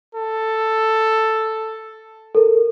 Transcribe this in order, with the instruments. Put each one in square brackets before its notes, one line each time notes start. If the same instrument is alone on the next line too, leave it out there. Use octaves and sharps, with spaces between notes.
[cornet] A4
[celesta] A4 A#4